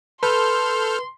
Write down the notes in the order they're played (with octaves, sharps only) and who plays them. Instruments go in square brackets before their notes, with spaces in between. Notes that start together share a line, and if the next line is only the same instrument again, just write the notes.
[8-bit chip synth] A4 F6 G6 [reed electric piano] B4 [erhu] C6